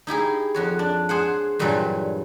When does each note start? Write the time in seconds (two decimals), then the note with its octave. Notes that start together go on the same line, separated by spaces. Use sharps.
0.07 D#4 E4 G4 G#4
0.54 F2 F#4 C#5
0.79 D4
1.09 G#4 C5 F#5
1.59 G2 A#2 E3 F#3 G3